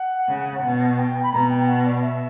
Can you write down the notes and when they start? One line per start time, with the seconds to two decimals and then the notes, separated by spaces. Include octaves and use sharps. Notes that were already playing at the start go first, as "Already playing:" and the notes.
Already playing: F#5
0.28 C#3
0.63 B2
0.98 G5
1.23 B5
1.32 B2 A#5
1.50 G5
1.67 F#5
1.85 D5
2.02 E5